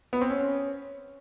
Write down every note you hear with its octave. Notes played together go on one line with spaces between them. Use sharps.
B3
C4
C#4